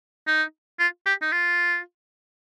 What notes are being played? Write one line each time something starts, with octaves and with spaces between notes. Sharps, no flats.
D#4
F4
G4
D#4
F4